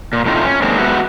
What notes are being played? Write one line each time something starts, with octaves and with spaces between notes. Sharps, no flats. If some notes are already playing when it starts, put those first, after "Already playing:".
A#2
A2 C3 A3 D#4 F4 G5
C#4
D#3 G#3 A#3 C4 D4
G#3 B3 F#4 G4 E5 F#5